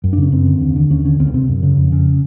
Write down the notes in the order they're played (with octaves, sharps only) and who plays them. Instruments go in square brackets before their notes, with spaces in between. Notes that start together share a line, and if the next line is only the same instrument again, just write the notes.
[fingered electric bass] F#2
D4
C#3 C#4
F#2 C4
D3
D#2
D3
D#2 C#4
D3 C#4
C#2 C4
C#4
C3 C4
F#2
C#3
F2
C#3